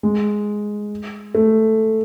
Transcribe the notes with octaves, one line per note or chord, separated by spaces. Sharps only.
G#3
A3